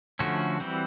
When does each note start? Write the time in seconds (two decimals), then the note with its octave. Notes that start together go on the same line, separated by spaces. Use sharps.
0.19 D3 F3 A3 C#4 F#4
0.60 E3 G3 C4